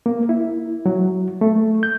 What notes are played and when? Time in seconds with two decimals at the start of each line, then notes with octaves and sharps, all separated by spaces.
0.06 A#3
0.29 E4
0.86 F#3
1.41 A3
1.83 G6